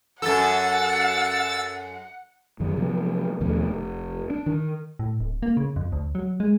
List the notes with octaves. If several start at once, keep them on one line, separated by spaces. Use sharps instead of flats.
F#2 A#2 A4 F#5 E6 A6
F#2 D#3 F#3
C3 F3 F#3 B3
D#2 B2 F3 A3
F1
D4
D#3
A2
D1
A#3
C#3
F2
D2
F#3
G#3